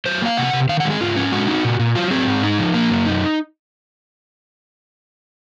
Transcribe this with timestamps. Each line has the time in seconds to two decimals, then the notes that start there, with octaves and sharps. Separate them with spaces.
0.06 F#3 C5
0.22 A#3 F5
0.37 C3 F#5
0.53 C3
0.69 D#3 F5
0.80 F#5
0.85 G#3
0.90 G#4
1.00 G#2 F4
1.16 C#4
1.32 G#3 F#4
1.47 D#4
1.64 A#2
1.79 A#2
1.95 F#3 F4
2.11 C4 G#4
2.27 G#2
2.43 D#4
2.58 F3
2.74 A#3
2.90 F#2
3.05 D#4